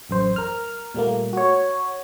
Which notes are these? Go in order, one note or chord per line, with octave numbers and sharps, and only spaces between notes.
A1 F#2 C5
A#4 F6
A#2 G3 A3 A#3
F#4 C#5